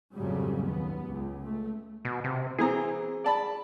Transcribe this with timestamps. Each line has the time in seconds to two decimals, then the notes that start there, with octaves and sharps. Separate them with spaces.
0.13 A#1 F2 G#2 C#3 F#3 G3
0.63 D#2 B3
1.05 C#2
1.45 A3
2.05 B2
2.24 C3
2.58 E3 C4 G#4 A#5
3.24 D5 A5 B5